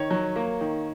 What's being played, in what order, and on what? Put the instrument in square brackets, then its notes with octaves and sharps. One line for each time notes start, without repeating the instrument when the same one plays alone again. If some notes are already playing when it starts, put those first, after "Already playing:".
Already playing: [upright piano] D#3 C#5
F#3
A#3
D#3